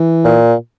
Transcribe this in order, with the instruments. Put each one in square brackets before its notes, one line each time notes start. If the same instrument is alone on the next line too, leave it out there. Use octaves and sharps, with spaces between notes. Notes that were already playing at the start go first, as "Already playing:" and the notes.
Already playing: [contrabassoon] E3
[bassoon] A#2